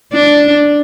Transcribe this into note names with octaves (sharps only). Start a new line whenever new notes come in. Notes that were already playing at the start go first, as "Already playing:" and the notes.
D4